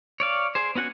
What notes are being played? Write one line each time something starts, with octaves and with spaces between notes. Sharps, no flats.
C#5 D5 F5
G#4 C5
B3 C#4 F#4 F#5 G#5